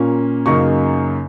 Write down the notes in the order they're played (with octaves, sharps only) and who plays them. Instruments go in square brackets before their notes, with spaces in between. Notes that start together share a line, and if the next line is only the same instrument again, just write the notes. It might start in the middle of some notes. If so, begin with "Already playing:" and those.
Already playing: [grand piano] A#2 A#3 C#4
F#2 C#3 A#3 D#4 C#6